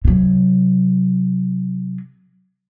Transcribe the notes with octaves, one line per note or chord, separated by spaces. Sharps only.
C3 F#3